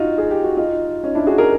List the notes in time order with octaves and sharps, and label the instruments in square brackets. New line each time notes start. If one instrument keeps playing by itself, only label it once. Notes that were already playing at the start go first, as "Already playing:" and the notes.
Already playing: [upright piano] D#4 F4 F#4
G#4
G4
F#4
D#4 F4
C#4 D#4
D4 E4
F#4 G#4
G#4 A#4